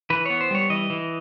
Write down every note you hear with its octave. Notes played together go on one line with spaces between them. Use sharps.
E3 B4
B3 C#5
C5
G3 C#5
E3 D#5
E3